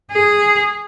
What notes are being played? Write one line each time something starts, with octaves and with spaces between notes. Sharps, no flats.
G#4